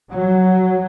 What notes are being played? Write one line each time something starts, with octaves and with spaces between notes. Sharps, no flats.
F#3